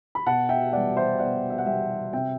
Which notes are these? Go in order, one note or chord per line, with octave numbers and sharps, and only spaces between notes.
B5
B2 F#5 A5
E5 G5
G3 B3 D5 F#5
C5 E5
B2 D5 F#5
E5
F#5
G3 B3 E5 G5
C3 E5 G5